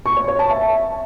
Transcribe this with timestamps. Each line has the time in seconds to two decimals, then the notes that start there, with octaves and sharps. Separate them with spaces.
0.06 C#6
0.17 C#5
0.28 C#5
0.39 A5
0.50 E5